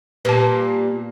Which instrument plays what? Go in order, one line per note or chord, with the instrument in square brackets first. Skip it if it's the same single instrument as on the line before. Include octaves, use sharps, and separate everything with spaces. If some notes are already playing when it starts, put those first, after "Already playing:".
[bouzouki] A#2 G3 A#3 [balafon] B4 A5